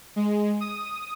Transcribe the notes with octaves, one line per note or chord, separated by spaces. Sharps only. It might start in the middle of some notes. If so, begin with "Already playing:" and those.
G#3
D#6